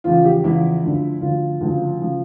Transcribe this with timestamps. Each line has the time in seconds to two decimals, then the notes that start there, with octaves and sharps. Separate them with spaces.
0.04 E2 C#3 F3 F4
0.25 G4
0.44 E2 C#3 F3 E4
0.83 D2 D3 F3
1.21 D2 D3 F3 F4
1.61 D2 C#3 F3
2.01 C#3 F3